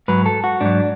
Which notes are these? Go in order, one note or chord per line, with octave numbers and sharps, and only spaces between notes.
G#2 F#3 B4
A4
F#4
G#2 F#3 D4